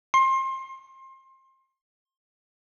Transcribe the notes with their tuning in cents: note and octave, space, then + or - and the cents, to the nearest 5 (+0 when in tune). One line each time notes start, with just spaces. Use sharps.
C6 +25